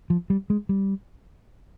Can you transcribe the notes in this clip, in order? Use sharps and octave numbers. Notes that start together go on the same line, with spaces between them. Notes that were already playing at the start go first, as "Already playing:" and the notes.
F3
G3
G#3
G3